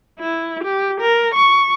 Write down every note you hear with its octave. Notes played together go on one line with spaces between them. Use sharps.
E4
G4
A#4
C#6